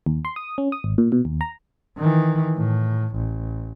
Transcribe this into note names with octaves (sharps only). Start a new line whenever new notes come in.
D#2
C6
D#6
C#4
D#6
G#1
A#2
B2
D#2
A#5
D#3 E3
A2
A1